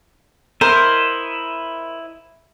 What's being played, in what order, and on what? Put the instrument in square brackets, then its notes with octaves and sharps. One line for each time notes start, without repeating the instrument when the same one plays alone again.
[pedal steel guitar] E4 D#5 E5 [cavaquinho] A#4 C5